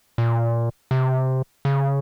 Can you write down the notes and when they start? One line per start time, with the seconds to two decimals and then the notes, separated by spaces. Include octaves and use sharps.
0.18 A#2
0.91 C3
1.65 C#3